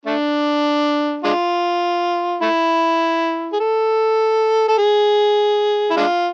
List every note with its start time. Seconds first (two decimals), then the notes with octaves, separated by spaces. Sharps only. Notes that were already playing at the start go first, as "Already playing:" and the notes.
0.06 A3 D4
1.24 G#3 D4 F4
2.42 A3 E4
3.53 G#4
3.60 A4
4.68 A4
4.78 G#4
5.91 E4
5.97 G#3 D4 F4